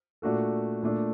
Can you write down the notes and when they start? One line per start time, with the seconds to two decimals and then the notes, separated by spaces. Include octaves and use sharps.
0.22 A#2 A3 D4 F#4 A4
0.83 A#2 A3 D4